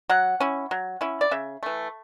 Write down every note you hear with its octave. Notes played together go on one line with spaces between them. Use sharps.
F#3 F#5
C#4 E4
F#3
C#4 E4
D5
C#3 E5
E3 A3